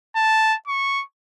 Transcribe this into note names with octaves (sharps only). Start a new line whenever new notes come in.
A5
C#6